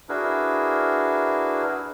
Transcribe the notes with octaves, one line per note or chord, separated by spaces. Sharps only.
D4 E4 F#4 G#4 A#4 B4